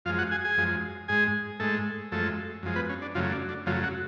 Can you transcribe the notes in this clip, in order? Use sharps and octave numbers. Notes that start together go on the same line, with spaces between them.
F#2 F3 G#3 F4 F5
F#4 F#5
G#4 G#5
G#4 G#5
F#2 F3 G#3
G#2 G#3 G#4 G#5
G#2 G#3 A3 A4
F#2 F3 G#3 A3 A4
F#2 F3 G#3
B3 B4
C#4
D4
F#2 C#3 F3 F#3 A3 F4
D4
D4
F#2 C#3 F3 F#3 A3 F4
F#3 F#4